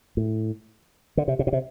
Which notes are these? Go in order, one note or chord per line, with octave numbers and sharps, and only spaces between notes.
A2
D3
C3
C3
B2
C3